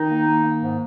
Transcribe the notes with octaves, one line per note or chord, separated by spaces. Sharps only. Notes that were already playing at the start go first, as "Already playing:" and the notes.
Already playing: D#3 D#4
A#3
A#3
A#3
G#2